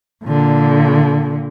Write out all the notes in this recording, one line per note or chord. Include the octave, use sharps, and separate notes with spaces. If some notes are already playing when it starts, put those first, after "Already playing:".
A#2 D3